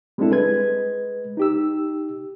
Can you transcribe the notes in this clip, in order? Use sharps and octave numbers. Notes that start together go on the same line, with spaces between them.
G3 G#3 C4 D4 E4 A4
G#3 B4 G#6
D#4 G4 E6